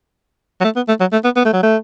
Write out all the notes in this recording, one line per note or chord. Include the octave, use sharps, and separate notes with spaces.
F#3
A3
B3
A3
F#3
A3
B3
B3
A3
F#3
A3